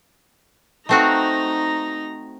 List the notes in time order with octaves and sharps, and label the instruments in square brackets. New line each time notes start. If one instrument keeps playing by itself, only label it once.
[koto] A3 C4 F#4 [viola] D#4 A#5